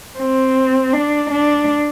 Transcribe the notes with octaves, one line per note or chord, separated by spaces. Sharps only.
C4
D4
D4